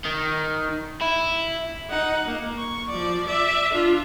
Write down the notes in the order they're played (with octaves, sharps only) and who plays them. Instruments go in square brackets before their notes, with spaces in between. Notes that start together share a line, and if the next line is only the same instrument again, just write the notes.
[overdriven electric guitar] D#3
E4
[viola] D#4 F#5
A#3
C#6
F3 D5
D5 E5
D4 F4